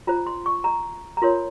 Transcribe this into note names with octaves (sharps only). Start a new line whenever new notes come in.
F4 C5 A#5
C6
C#6
A#5
A#5
F4 A#4 C#5 C6